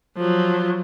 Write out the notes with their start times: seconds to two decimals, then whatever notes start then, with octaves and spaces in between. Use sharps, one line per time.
0.17 F3 F#3